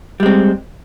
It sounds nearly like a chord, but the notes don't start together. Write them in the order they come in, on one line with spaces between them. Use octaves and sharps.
G3 G#3 C4